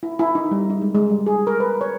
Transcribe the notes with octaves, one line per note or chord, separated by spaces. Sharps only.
E4
E4
D#4
G3
D#4
G#3
G#3
G3
G#4
A#4
B4
C#5